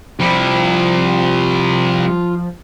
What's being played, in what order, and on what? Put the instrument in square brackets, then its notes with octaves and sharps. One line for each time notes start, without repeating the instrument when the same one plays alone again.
[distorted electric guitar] C3 G3 [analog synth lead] F3 [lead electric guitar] F4 B5